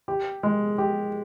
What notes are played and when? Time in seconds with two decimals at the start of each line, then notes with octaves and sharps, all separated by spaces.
0.08 G4
0.43 G#3
0.78 G4